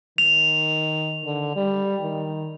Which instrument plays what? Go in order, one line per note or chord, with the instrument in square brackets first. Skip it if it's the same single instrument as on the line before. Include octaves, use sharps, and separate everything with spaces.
[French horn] D#3 [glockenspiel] F7
[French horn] D3
G3
D#3